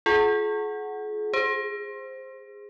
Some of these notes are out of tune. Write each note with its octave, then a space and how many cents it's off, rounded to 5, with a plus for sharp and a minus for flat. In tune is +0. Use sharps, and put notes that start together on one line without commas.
F4 +0 G#4 +40 F#5 +5
G#4 -15 C5 +0